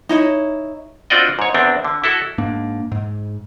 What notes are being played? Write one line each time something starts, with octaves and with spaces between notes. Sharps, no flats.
D#4 E4 C#5
C4 D4 F4 F#4 D5 D#5
G#2 C#5
E2 C4 D4
D3
E4 F#4 A4
G#2 A#3 D4
G#2